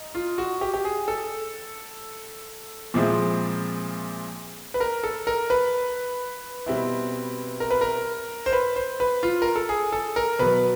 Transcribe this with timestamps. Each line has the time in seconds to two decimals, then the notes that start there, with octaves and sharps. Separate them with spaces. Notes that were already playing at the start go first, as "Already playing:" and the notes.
Already playing: D#4
0.15 F4
0.38 F#4
0.61 G4
0.74 G4
0.84 G#4
1.08 A4
2.94 A#2 F3 G#3 C4 E4
4.74 B4
4.80 A#4
5.04 A4
5.27 A#4
5.50 B4
6.66 B2 G3 C4 E4
7.60 A#4
7.71 B4
7.81 A#4
8.46 C5
8.53 B4
8.76 C5
9.00 B4
9.23 F4
9.42 A#4
9.56 A4
9.69 G#4
9.92 A4
10.16 A#4
10.39 B2 F#3 B3 B4